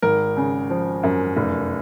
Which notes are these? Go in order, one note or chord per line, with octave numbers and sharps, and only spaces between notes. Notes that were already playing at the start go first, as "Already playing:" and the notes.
G#1 A#4
C#3
F3
F#2
F1